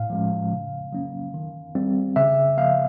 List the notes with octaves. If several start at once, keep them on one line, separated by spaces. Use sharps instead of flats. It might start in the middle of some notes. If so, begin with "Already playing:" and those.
Already playing: A2 F5
F3 G#3 C#4
C#3
F#3 A#3 C#4
D#3
G3 C4
C#3 E5
F3 A#3 F5